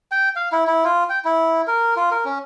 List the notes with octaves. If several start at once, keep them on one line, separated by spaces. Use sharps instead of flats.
G5
F5
E4
E4
F4
G5
E4
A#4
F4
A#4
C#4